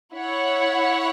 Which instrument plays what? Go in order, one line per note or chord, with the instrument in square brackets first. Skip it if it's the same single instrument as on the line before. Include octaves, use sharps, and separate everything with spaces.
[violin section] E4 C#5 F#5